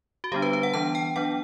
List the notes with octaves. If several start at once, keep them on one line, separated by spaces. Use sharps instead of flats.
F#4
D3 G3 B3 D4 G4
B4
B4
F#5
E3 B3 D4 A5
G5
F#3 B3 D4 F#5